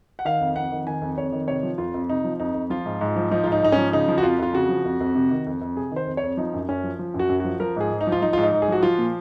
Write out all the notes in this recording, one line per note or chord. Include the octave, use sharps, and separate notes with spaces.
F#5
D#3 F5
F2
F2 F#5
D#3
D#3 G#5
F2
F2 C#5
D#3
C3 C#5
F3
F2 F4
F2
C3 D#4
F3
F2 D#4
F2
F3 F4
G#2
G#2
F3
F3 D#4
G#2 F4
D#4
G#2 D#4
F3 C#4
C#3 D#4
F3
F#4
F2 F4
F2 F4
C#3 F#4
F3
F2
F2
C3
D#3
F2
F2
C3 G#4
D#3 C5
F2
C#5
F2
F3 D#4
F#2
F#2 C#4
F3
F3
F#2
F#4
F#2
F3 F#4
F3 A#4
G#2 G#4
G#2
D#4
F3
F4
F3 D#4
G#2 F4
D#4
G#2
G#4
F3 F#4
F3 F4
A#2